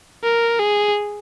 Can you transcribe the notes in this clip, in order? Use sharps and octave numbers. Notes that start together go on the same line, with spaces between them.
A#4
G#4